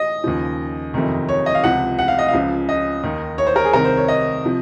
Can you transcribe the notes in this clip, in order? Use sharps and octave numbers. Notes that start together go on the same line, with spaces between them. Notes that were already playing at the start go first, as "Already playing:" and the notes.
Already playing: D#5
D#2 C#3 F3
F#1 F2 C3 D#3
C#5
D#5
F5
C#2 C3 F3 F#5
F#5
F5
D#5
F5
C#2 C#3 F3
D#5
D#2 D#3
C#5
C5
A#4
G#4
C2 C3 D#3 A#4
C5
C#5
D#5
C3 F3